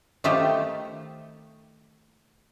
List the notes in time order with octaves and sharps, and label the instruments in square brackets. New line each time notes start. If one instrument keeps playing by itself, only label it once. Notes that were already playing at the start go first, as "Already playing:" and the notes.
[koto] D#3 A3 F4 G4 C5